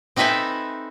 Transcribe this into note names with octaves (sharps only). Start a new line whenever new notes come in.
C4 D#4 A4 B4 E5 G#5